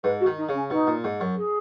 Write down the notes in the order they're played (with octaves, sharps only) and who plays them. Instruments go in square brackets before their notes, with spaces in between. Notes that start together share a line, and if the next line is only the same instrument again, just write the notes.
[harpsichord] G#2 [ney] B4
[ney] F#4
[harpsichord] D#3
[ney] D#4
[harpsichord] C#3
[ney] C#4
[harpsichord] B2 [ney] D#4
[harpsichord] A#2
G#2
F#2
[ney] G#4